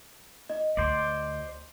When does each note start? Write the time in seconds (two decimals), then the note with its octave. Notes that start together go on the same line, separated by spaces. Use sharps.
0.50 D#5
0.77 D2 C5 D5